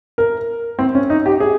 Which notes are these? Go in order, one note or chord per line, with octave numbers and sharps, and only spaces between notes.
A#4
C4
C#4
D#4
G4
G#4